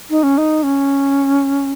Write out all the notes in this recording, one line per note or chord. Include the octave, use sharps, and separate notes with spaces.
D#4
C#4
D#4
C#4